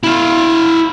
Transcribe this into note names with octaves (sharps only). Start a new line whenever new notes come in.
E4 F5